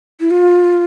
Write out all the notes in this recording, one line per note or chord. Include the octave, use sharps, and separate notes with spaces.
E4
F4